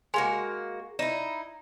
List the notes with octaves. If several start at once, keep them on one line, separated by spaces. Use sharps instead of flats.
G#3 A#3 F#4 G#5 C6
D#4 E4 D5 E7